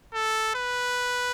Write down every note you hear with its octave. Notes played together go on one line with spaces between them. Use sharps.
A4
B4